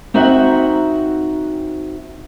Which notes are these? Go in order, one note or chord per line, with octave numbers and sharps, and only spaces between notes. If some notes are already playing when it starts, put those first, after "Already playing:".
C4 D#4 F#4 E5 F#5